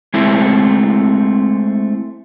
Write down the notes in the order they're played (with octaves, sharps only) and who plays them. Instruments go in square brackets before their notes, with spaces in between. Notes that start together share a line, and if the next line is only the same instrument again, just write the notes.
[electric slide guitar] G#3 A3 C4 E4